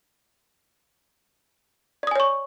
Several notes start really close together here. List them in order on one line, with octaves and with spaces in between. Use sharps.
D5 D#6 G#5 C#5 C#6